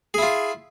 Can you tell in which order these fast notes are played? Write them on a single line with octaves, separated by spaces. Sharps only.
G#4 E4 F4